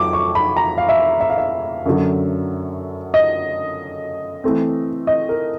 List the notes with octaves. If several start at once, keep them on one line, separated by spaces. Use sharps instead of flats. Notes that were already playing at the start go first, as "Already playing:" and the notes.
Already playing: F2 F#3 D6
C#6
B5
A#5
F5
E5
E5
F5
E5
F#2 D3 F#3
D#5
E3 A3 C4
D#5
A#4